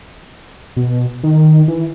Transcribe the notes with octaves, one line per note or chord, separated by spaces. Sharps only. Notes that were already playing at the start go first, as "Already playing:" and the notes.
B2
D#3
E3